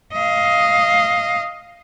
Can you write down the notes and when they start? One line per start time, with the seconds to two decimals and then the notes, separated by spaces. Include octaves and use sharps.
0.13 D#5 F5